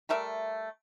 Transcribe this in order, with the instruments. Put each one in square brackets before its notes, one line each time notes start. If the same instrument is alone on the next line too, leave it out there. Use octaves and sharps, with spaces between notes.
[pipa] G3 A3 A#4 E5